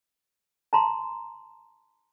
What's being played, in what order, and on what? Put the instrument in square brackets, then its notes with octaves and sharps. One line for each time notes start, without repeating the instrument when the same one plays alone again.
[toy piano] A5 A#5 C6